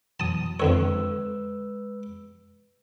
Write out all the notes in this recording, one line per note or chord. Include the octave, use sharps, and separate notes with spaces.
B2 E3 F#3 A5 D#6
F2 D3 G#3 B4 C#5 E6